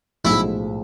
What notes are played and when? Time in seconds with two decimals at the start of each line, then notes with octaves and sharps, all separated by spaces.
0.25 B1 A2 F3 G#3 E4